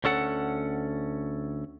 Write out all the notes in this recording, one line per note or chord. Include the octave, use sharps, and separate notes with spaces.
D2 C#4 A4 F#5